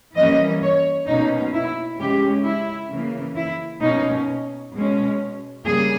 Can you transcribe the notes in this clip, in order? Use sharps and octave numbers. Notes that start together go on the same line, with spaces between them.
E3 G3 A#3 C#4 D#5
C#5
B2 A#3 C#4 D#4
E4
C#3 G#3 C#4 G4
E4
C#3 E3 A#3
E4
B2 A#3 C#4 D#4
B2 G#3 C#4
C#3 G3 A#3 G#4